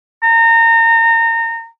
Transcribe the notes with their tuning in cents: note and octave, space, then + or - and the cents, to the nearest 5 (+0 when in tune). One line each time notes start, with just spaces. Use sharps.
A#5 -30